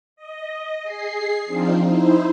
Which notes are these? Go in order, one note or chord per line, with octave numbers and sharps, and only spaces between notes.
D#5
G#4 C7
F3 C4 D4 D#4 F4
D#4 E4 C5